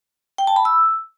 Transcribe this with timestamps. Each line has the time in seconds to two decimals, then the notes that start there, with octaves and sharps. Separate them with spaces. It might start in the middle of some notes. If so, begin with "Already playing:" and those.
0.38 G5
0.47 A5
0.56 B5
0.65 E6